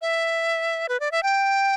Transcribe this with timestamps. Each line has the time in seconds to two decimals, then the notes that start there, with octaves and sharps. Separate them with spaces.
0.02 E5
0.89 B4
1.00 D5
1.12 E5
1.23 G5